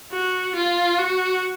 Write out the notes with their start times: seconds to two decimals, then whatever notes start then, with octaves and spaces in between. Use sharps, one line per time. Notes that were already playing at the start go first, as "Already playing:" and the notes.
0.12 F#4
0.56 F4
0.99 F#4